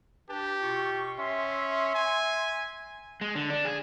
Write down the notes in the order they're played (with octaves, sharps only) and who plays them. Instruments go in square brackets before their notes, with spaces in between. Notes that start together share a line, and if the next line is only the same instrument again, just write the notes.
[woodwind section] D4 B4 A5 [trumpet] G4
[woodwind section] B2 F4 C#6
[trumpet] C#4 [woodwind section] E5 C6
[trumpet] G#5
[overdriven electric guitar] G#3
D3
D4
G#4